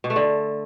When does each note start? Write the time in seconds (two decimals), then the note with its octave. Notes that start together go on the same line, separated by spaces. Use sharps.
0.04 B2
0.10 A3
0.16 D3